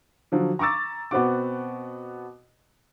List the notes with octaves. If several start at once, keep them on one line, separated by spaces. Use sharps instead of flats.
D3 F3 F#3
A#5 C#6 D6 E6 A6
B2 B3 C4 F#4 D6